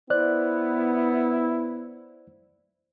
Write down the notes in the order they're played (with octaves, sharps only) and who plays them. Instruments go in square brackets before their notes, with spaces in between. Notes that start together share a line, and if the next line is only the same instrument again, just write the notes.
[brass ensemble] B3 [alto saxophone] E4 [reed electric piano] C5 D5 F#6